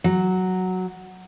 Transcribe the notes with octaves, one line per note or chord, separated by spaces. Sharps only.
F#3